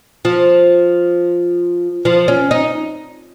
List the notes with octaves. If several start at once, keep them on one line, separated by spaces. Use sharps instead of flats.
F3
F3
C#4
D#4